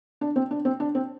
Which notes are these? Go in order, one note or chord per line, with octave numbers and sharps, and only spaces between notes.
D4
C4
D4
C4
D4
C4